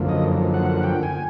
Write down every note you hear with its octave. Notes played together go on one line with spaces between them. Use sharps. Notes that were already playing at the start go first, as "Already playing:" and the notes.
Already playing: F#2 D3 F3 A#3
D#5
F#5
G5
G#5